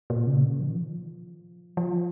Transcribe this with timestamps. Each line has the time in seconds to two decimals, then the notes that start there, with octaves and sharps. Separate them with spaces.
0.10 A#2
0.27 C#3
0.43 A#2
0.52 C#3
0.60 F3
0.68 D#3
0.76 F3
1.77 F3